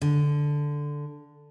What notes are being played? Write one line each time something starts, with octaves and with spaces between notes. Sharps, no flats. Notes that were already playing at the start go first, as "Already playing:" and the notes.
D3